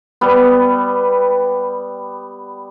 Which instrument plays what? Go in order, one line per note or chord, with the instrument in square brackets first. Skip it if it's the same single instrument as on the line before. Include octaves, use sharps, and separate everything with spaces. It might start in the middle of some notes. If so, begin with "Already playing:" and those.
[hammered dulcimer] G3 B3